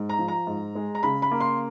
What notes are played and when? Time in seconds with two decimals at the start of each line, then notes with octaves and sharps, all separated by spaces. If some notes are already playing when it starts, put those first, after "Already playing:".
Already playing: G#2
0.09 A#5
0.19 F3
0.28 A#5
0.47 G#2
0.75 G#3
0.95 A#5
1.03 C#3 B5
1.22 B5
1.31 A#3
1.40 C6